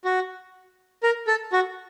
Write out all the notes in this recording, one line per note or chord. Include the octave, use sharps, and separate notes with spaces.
F#4
A#4
A4
F#4